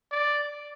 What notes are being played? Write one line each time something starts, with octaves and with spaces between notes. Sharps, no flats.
D5